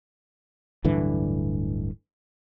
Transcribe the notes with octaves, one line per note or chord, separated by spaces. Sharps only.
D1 G2 D3 E3